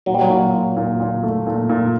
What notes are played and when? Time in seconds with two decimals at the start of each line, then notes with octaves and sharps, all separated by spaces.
0.06 A#2 F#3
0.14 G3
0.21 F#3
0.30 A#2
0.53 A#2
0.77 A#2
1.00 A#2
1.23 A3
1.47 A#2
1.70 A#2